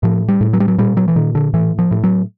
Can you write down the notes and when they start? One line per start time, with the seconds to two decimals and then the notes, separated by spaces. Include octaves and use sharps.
0.03 A2 F3
0.28 G3
0.41 A2
0.53 F#3
0.60 G3
0.68 F#3
0.78 A#2 G3
0.97 F#3
1.08 E3
1.16 A#2 D#3
1.35 D3
1.54 A2 E3
1.79 F3
1.91 A2
2.04 F#3